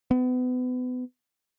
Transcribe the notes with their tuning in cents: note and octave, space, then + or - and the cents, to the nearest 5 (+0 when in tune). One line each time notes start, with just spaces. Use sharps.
B3 +30